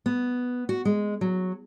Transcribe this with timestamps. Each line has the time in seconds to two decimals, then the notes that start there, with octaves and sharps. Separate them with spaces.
0.06 B3
0.69 F#4
0.85 G#3
1.21 F#3